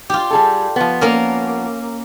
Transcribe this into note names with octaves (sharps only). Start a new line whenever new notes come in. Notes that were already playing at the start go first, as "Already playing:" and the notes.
F4 G4
G3 G#4 A4
F3 B3
A#3 C#4 A#4